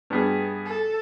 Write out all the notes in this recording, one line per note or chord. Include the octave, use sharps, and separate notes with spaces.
G2 B3 G#4
A4